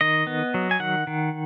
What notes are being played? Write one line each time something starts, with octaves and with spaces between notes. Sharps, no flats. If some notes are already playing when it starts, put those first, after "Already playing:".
D#3 D#5
B3
F#3
G#5
D#3 F#5
D#3